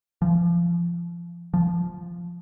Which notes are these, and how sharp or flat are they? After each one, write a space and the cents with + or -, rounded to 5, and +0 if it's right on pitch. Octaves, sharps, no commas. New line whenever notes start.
F3 -25
F3 -5